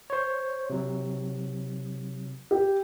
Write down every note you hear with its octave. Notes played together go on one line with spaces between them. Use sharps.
C5 C#5
C3 F#3
G4